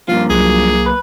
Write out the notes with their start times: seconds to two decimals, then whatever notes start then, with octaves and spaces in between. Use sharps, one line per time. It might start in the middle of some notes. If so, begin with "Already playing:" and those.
0.08 G2 F3 A#3 F4
0.30 C2 F#3 G#4
0.86 B4